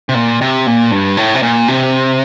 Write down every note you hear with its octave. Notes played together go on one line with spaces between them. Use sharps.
C3
A#2
C3
A#2
G2
A2
C3
A#2
C3